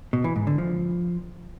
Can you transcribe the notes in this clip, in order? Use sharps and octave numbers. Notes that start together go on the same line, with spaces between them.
B2
E3
G#2
D3
F3